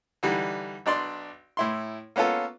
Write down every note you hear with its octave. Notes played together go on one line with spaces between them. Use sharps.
D3 E3 G3 D#4
B1 D4 D5 C6
A2 E4 C6
A#3 B3 C#4 F4 A4